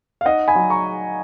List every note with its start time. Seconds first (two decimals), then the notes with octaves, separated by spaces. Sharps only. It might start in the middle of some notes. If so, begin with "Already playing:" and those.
0.21 F5
0.25 D#4 D#5 F#5
0.48 G#5 B5
0.55 F#3
0.70 A#5 C#6